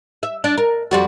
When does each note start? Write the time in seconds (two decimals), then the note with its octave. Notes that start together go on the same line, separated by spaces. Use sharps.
0.23 E5
0.44 D4
0.58 A#4
0.91 F2 G3 F#4